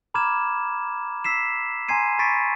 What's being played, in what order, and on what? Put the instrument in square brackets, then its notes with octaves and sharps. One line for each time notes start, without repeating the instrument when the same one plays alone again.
[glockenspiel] A#5 B5 D6 F6 G#6 E7
E6 B6 C7 E7
G#5 A#5 C6 G#6 C7 D#7
B5 C#6 A6 B6 D7 D#7